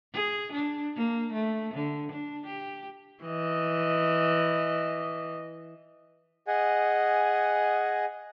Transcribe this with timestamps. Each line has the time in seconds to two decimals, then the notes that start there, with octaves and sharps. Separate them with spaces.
0.13 G#4
0.53 D4
0.96 A#3
1.33 A3
1.74 D3
2.12 D4
2.46 G4
3.24 E3 D#5
6.48 G#4 D#5 F#5 G#5